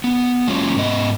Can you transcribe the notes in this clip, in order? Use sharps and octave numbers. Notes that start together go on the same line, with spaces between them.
B3
F#3 G#3 A#3 C#4 F4 C#5
G#2 B3 D#5